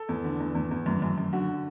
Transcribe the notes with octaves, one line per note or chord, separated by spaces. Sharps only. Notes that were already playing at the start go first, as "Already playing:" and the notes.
Already playing: A4
E2
D3
E2
E2
E2
F#2
F#2
F#2
D3 F#4